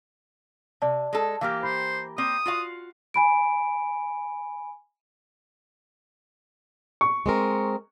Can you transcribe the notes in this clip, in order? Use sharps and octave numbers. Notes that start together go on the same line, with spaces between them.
C3 D5 A5
G#3 A4
E3 A#3 G4 F5 F6
C5 B5
A#3 C4 D#6
F4 F#4 F5
G#5 B5 D7
C#6
G#3 C4 A#4